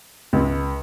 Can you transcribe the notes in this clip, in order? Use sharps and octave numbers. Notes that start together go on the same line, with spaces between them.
C#2